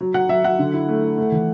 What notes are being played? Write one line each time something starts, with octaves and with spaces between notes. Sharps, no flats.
F#3
F#3 F#5
F#3 E5
F#3 F#5
D3
E4
A3
E4
A3
E3